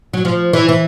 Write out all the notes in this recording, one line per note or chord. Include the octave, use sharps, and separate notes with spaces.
F#3
F3
E3
E3